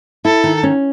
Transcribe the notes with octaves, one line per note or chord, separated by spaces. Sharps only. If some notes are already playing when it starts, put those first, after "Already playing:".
E4 A4
D#3
C#4